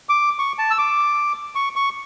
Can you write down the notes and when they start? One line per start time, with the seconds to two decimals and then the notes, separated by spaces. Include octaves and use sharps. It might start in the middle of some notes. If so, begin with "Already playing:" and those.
0.09 D6
0.39 C#6
0.59 A5
0.71 E6
0.78 D6
1.55 C#6
1.76 C#6